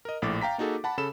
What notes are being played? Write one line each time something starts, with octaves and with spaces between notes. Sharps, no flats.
A#4 D#5
A#1 A2 D6 A6
F5 G5 A#5 B6
A#3 D#4 F#4 G#4 A4
F#5 A5 B5
C#3 A4 B5 E7